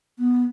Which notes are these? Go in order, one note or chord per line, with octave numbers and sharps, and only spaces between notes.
B3